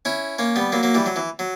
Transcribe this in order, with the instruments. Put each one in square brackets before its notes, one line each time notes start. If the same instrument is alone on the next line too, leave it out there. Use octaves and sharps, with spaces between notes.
[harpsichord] C#4 E4
A#3 C#4
G3 B3
F#3 A#3
F#3 A#3
E3 G3
F#3
E3
F#3